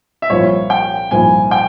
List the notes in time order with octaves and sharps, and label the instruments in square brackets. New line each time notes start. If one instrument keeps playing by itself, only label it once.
[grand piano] E5
[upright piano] C2 A#2 F3 A#3 E4 [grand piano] C#5
[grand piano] G5
[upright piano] C2 A#2 F3 A#3 E4 [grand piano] G#5
[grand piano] G5